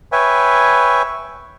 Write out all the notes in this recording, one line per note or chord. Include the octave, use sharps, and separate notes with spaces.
B4 C#5 E5 G5 G#5